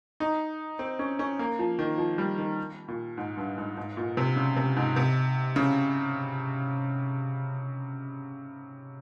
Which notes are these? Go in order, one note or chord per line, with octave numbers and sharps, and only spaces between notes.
D#4
C4
C#4
C#4
A#3
F3
D#3
F3
G3
D#3
A#2
G#2
G2
G#2
G#2
A#2
C3
C#3
C3
G#2
C3
C#3